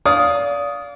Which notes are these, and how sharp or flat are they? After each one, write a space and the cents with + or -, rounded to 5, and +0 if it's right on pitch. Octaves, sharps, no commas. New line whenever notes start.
D5 -30 F5 +10 D#6 +0